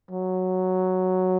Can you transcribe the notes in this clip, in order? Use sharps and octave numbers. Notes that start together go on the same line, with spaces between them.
F#3